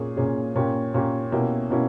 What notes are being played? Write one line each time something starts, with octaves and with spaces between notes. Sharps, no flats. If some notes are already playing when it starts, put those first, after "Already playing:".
Already playing: A#2 A#3 C#4 G#4
A#2 A#3 C#4 G#4
A#2 A#3 C#4 G4
A#2 A#3 C#4 G4
B2 A#3 C#4 E4 G4
B2 A#3 C#4 E4